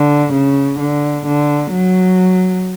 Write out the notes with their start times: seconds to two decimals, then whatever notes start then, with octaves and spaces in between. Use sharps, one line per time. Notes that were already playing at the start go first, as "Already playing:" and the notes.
Already playing: D3
0.33 C#3
0.80 D3
1.26 D3
1.72 F#3